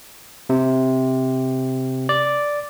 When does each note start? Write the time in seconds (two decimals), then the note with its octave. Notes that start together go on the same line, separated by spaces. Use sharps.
0.49 C3
2.09 D5